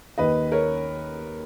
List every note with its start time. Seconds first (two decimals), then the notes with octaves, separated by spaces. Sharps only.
0.18 D#2 D#3 B4 D#5
0.52 A#4 C#5